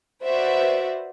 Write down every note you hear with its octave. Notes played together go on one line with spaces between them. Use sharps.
F#4 B4 C5 D5 E5